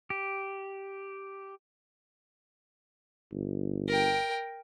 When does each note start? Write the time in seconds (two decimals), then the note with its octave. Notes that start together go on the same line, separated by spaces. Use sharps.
0.10 G4
3.32 G1
3.88 A#4 G5